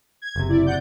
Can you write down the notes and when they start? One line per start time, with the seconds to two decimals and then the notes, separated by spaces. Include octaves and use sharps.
0.22 G#6
0.36 F#1 C3
0.49 E4 D5
0.66 D5 F#5 G6